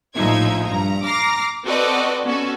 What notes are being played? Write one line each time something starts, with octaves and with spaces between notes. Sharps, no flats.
A#1 A2 F3 D#4 E5 G#6
G2 A#5
A#5 D6 F6 A#6 C7
C4 F#4 A4 B4 D5 D#5
B3 C#4 F#4 A4